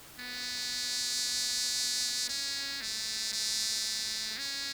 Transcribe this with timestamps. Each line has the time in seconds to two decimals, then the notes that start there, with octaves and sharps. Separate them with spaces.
0.19 B3
2.29 C#4
2.81 A3
3.33 A3
4.38 C#4